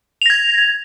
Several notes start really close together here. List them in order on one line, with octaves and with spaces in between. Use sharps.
F7 A#6 G#6